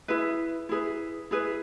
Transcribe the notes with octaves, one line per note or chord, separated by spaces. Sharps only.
E4 G#4 B4
E4 G#4 B4
E4 G#4 B4